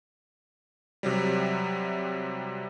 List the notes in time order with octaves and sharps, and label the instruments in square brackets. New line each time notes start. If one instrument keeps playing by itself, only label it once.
[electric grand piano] C3 F#3 G3